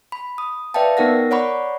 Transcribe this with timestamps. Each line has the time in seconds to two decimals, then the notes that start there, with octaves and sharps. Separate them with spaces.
0.12 B5
0.38 D#6
0.74 B4 D5 E5 F5 G5 A5
0.97 B3 D#4 A#4 F#5 A#6
1.31 C#5 D5 F#5 A#5 B5 C#6